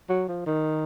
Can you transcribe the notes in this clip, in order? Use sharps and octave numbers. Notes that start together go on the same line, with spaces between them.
F#3
F3
D#3